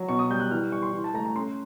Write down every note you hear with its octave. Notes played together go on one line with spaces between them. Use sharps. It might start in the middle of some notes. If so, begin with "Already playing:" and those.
Already playing: F#3
B2 C#6
D#6
G3 G6
F#6
E3 F6
G3 C#6
C6
E3
A5
A3 A#5
A#5
C#4 C6